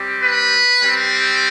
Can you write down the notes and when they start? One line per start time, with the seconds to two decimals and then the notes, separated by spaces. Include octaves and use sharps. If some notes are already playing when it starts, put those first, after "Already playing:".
Already playing: G3 C4 G4
0.24 B4
0.82 G3 C4 G4